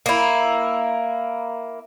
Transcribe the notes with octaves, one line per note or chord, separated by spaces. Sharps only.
A#3 E4